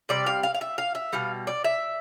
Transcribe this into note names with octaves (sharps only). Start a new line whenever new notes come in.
C3 G3 D5
F5
F5
F5
E5
F5
E5
B2 G3 F5
D5
E5